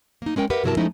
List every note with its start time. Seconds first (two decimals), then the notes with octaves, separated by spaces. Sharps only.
0.22 A#3 D#4
0.36 G#3 C#4 A#4 G5
0.50 G4 A#4 B4 E5 F#5
0.64 G2 C3 F#3 E4 A#4 A5
0.77 F3 G#3 A3 C#4 D#4 E4